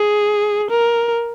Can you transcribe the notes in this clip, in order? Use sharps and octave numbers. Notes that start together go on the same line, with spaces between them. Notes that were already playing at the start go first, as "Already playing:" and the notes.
Already playing: G#4
A#4